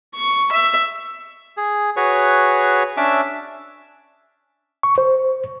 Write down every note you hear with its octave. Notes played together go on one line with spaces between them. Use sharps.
C#6
E5
G#4
F#4 G#4 B4 C#5
C#4 D4 E5 D6 E6
C#6
C5